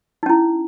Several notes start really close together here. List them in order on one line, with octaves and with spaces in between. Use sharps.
D#4 C#4 E4